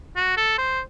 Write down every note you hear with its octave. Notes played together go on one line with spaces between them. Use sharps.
F#4
A4
C5